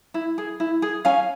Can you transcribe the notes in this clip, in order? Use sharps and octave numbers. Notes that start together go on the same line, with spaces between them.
E4
G#4
E4
G#4
C#4 F5 G#5